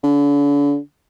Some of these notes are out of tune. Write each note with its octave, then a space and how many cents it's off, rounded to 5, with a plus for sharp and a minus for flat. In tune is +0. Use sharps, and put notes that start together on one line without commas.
D3 -40